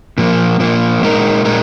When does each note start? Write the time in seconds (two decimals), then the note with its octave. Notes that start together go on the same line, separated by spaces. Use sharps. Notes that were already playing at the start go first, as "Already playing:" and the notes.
0.18 A#2 F3 A#3
0.60 A#2 F3 A#3
1.02 A#2 G#3 D#4 A#4
1.45 A#2 G#3 D#4 A#4